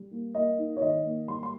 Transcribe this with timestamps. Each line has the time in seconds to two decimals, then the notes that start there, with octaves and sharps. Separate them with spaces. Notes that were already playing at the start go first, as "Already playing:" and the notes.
Already playing: G3
0.11 A#3
0.34 A#3 D#5
0.58 D#4
0.77 C#5
0.81 D#3 D#5
1.05 A#3
1.28 G3 C6
1.43 C6